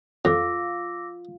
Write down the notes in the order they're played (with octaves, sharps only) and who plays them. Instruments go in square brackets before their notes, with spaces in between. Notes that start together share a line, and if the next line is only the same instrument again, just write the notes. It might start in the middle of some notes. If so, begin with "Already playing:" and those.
[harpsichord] F2 [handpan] F4 [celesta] D6 E6 A#6